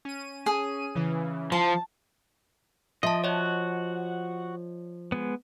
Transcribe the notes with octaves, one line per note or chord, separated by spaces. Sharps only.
C#4 D#7
G#4
C#3 E3
F3 A5
F3 D#5 E5 A5
F#4 C#5 D#5 F#5
G#3 B3